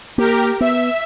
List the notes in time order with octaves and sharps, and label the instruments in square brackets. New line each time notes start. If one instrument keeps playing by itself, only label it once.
[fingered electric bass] A#3 [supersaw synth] G4 A#4
[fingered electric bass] B3 [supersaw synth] E5